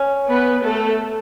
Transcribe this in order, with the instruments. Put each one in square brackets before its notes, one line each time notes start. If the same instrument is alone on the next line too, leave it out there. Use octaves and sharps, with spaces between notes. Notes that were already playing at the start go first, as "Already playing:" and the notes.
Already playing: [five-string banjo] C#4
[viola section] B3 B4
A3 A4